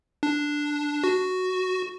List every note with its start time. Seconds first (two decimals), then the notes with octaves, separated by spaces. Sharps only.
0.23 D4
1.04 F#4